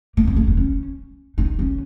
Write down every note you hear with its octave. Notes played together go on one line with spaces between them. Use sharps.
A#3
C4
A#3
A#3
C#4
D#4
C#4